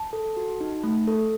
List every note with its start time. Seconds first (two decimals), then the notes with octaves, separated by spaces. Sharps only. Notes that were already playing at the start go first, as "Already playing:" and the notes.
Already playing: A5
0.13 A4
0.37 F#4
0.60 D#4
0.84 A3
1.07 A4